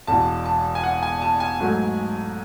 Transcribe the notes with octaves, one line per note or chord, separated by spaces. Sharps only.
E1 E2 B2 A5
A5
G#5
F#5
G#5
A5
G#5
G#2 F#3 A3